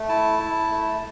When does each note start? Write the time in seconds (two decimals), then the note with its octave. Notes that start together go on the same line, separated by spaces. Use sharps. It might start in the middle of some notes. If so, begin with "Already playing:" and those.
Already playing: A3
0.09 E4 A5
0.39 E4
0.70 A3